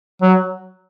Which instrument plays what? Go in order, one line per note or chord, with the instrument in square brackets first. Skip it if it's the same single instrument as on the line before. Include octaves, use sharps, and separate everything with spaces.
[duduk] F#3